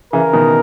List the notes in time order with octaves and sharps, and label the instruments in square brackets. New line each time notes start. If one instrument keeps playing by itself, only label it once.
[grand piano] C#3 E3 [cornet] A#4
[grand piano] B2 D#3